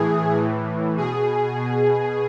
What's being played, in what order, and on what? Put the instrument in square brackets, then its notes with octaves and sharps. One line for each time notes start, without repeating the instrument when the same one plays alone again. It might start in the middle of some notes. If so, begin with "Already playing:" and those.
Already playing: [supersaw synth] A2 E3 G#4
A2 E3
B2 G#4
B2